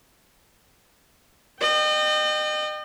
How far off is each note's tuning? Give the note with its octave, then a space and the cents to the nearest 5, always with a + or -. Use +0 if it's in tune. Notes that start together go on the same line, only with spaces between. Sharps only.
D#5 -40 G5 +0